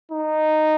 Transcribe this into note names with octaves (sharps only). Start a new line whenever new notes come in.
D#4